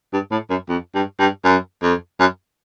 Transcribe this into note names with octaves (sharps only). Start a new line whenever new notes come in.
G2
A2
F#2
F2
G2
G2
F#2
F2
F#2